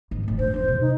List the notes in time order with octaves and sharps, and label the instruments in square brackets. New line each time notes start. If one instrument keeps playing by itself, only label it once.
[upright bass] G#1
F#2 A2
[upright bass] D4 [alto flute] C5
[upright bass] E2 B3
C3
[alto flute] D#4